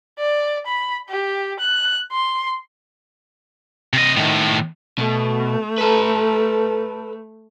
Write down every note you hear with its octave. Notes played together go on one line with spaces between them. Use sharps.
D5
B5
G4
F#6
C6
C3 D#5
A2 D#3
B2 A3
A4 B4